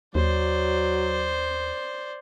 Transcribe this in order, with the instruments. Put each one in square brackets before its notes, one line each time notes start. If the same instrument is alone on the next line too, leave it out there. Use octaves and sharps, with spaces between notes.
[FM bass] D#2 [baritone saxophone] F#3 [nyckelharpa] C5 D5